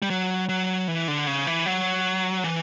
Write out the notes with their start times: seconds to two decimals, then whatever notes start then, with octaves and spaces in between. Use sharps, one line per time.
0.02 G3
0.10 F#3
0.49 F#3
0.88 E3
1.08 D3
1.27 C#3
1.47 E3
1.66 F#3
2.44 E3